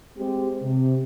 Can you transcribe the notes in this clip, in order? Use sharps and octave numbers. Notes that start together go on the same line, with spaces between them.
G#3 C4 G4
C3